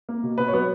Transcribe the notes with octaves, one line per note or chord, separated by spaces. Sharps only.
A#3
B2
B2 B3 B4
C#5
F#3 B3 B4